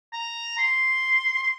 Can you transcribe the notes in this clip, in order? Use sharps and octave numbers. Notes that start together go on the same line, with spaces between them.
A#5
C6
C6